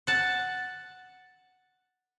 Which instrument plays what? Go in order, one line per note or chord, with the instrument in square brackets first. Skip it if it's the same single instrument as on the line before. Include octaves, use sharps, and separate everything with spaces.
[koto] F#5 A5